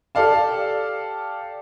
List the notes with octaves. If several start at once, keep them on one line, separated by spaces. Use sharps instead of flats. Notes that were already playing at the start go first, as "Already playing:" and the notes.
G4 A4 D5 F5 A5